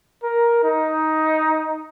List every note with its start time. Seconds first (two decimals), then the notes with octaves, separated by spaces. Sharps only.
0.23 A#4
0.64 D#4